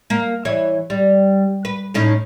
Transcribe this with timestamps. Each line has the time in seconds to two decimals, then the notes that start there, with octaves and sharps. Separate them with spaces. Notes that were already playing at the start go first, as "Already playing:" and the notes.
0.10 A#3
0.45 E3 C#5
0.90 G3
1.65 B4
1.94 A2 C#4 D#4